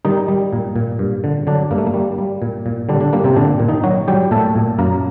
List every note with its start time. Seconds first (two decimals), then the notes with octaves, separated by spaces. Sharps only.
0.05 D#3 G3 D#4
0.28 G3
0.53 A#2
0.76 A#2
0.99 G2
1.24 D3
1.47 D3 F#3 D4
1.71 G2 A#3
1.78 A3
1.87 A#3
1.94 G3
2.18 G3
2.42 A#2
2.66 A#2
2.89 D3 G3 D4
3.00 D3 D4
3.13 G3 A#3
3.24 C3 C4
3.36 A#2 D3 D4
3.60 A#2
3.68 D#3 D#4
3.84 F#3 F#4
4.08 F#3 G3 G4
4.31 A#2 A3 A4
4.56 A#2
4.79 F#2 A#3 A#4